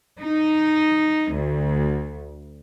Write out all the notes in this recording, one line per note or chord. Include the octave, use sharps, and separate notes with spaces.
D#4
D2